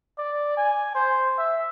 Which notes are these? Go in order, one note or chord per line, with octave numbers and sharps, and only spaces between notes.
D5
G#5
C5
E5